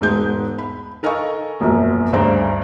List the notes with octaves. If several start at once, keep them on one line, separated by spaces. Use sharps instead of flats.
E1 G#2 G#3 G6
B5
A4 A#4 D#5 F5 G#5 C#6
E1 A#1 F#2
D2 G2 C#3 C5 D5 A#5